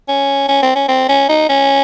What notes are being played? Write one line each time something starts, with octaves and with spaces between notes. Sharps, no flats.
C#4
C#4
C4
C#4
C4
C#4
D#4
C#4